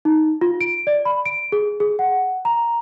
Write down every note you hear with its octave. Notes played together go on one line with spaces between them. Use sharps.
D#4
F4
D7
D5
B5
D7
G#4
G#4
F#5
A#5